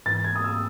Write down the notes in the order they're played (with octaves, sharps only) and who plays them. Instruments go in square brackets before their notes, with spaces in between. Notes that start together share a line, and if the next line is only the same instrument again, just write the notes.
[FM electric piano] G#2 E3 B3 [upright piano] A6
[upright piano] G#6
D#6
E6